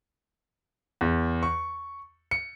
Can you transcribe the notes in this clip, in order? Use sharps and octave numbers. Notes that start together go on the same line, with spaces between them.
E2
C#6
C#7